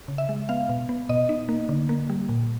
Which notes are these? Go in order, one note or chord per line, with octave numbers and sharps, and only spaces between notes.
C#3
E5
G#3
B3 F5
B2
B3
B2 D#5
D#4
A#3
D3
A#3
G3
A#2